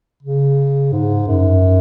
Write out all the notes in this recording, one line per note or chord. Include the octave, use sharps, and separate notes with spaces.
C#3
G#2
F#2